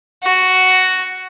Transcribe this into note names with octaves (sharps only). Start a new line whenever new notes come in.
F#4